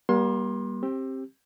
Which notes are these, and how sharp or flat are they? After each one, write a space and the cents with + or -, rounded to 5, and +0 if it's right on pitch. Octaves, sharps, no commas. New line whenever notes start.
G3 +0 A#3 +40 C6 +25
C4 +20 G4 +0